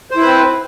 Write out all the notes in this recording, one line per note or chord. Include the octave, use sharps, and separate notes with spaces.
C4 E4 B4 C5